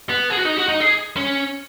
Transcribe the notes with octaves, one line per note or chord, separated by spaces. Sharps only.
B3
G#4
F#4
D#4
F#4
D#4
G#4
C#4